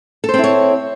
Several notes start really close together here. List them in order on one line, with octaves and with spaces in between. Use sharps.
A4 C5 C4 E4 C#5